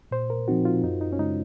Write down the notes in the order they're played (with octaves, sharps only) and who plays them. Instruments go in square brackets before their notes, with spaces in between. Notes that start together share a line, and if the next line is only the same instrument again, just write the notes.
[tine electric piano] A#2 [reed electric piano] C5
[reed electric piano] A#4
[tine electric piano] F3 C4 D#4 [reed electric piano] F#4
[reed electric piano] F4
[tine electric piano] F#2 [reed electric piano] D#4
[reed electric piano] D#4
C#4
[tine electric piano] C#3 G#3 [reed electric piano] D#4